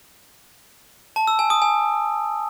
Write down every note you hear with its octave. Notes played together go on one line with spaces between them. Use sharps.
A5
E6
G#5
D#6
G#5